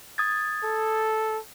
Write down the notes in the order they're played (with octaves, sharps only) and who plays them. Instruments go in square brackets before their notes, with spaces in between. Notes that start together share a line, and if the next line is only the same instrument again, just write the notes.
[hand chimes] D#6 G#6 A6
[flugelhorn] A4